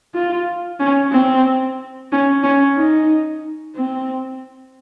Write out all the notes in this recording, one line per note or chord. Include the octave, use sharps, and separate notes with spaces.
F4
C#4
C4
C#4
C#4
D#4
C4